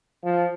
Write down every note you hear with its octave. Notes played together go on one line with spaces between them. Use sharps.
F3